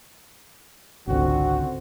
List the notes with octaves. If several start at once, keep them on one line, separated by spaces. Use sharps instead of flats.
G#1 C#2 D3 C4 F#4